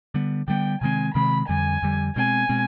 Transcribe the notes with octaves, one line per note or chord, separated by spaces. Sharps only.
D3 G3 B3
D3 G3 B3 G5
C3 D#3 G#3 C4 G#5
C3 D#3 G#3 C4 B5
F2 D3 G3 G#5
F2 D3 G3
B2 G#3 C4 G#5
B2 G#3 C4